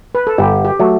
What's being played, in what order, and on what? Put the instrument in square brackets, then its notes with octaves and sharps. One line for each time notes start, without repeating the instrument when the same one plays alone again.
[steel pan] B4
A4
[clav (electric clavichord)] G1 [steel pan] G4
[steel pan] G4
[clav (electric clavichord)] F#3 A3